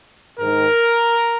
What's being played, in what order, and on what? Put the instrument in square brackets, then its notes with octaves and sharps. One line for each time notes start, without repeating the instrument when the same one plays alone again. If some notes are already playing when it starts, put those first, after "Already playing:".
[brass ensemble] G#2 D#3 A#4